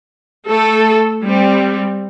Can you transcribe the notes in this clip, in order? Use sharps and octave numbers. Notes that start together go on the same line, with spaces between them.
A3 A4
G3 C4